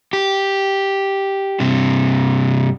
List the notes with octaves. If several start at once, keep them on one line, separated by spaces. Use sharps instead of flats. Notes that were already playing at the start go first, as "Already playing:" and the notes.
G4
G2 C3